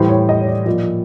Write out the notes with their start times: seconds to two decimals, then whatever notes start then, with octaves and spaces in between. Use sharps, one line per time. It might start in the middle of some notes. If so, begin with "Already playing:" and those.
Already playing: A2 E3 G3 C5
0.09 C#5
0.29 D#5
0.41 C#5
0.47 D5
0.66 A#2 F3 D5